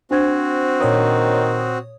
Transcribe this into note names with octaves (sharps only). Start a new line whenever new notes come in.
C4 D4 F#4 C5 G#6
A#2 D#3 C#5 D#6